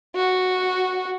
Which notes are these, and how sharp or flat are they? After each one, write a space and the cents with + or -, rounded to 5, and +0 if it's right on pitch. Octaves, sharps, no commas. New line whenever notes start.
F#4 -5